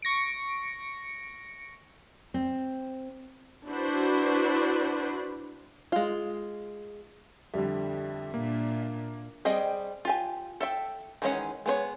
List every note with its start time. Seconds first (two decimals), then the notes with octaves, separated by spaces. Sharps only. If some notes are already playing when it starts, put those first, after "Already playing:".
0.02 C#6 A#6 C#7 D7
2.34 C4
3.66 D4 E4 F#4 B4 C5
5.92 G#3 F4
7.54 F2 D3 G3 E5
8.34 A#2 A#3 D4
9.45 G3 C4 G#4 D#5 G5
10.05 F4 G4 G#5
10.60 A4 E5 G5
11.22 D#3 E3 G#3 C#4 F#5
11.66 G#3 B3 C5 C#5